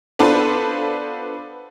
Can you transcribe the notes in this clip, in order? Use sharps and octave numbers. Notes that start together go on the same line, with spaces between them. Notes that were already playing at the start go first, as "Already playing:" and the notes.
B3 D4 F4 A4 B4 C5